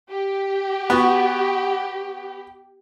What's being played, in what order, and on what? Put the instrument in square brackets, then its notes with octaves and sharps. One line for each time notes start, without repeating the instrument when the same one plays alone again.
[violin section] G4
[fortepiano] B3 F#4